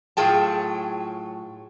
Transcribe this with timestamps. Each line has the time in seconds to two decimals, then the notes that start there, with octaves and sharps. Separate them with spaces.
0.17 A2 F#3 F4 G#4 G5 A5